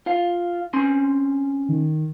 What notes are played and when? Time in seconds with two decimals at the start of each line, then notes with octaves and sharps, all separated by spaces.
0.06 F4 F5
0.73 C4 C#4 C6
1.69 D#3